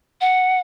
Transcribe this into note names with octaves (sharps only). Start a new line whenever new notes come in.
F#5